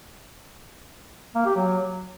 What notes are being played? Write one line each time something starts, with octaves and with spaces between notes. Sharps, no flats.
A#3
G4
F#3